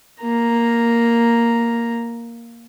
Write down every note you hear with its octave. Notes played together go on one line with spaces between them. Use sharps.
A#3 A#5